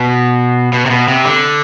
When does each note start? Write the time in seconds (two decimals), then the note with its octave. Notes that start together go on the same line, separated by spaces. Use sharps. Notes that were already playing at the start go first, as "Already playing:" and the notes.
Already playing: B2
0.73 B2
0.86 C3
0.90 B2
1.08 C3
1.25 D3